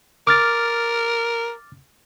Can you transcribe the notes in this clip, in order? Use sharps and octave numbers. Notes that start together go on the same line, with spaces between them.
A#4 D6 F6 A6